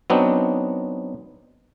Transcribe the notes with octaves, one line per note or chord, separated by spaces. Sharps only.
F#3 B3 C4 D4 D#4